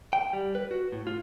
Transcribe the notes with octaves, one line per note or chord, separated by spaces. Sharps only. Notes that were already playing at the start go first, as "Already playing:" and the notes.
G5
G3
B4
F#4
A2
F4